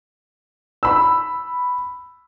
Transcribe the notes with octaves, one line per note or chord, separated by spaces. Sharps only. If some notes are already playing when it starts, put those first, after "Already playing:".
B5 E6